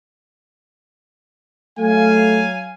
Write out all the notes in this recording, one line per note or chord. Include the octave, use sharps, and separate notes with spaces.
F#3 A3 F5 G#5